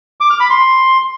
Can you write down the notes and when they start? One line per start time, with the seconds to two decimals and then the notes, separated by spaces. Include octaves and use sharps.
0.21 D6
0.30 F6
0.40 B5
0.50 C6